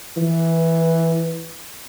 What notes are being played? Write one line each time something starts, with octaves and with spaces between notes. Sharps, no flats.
E3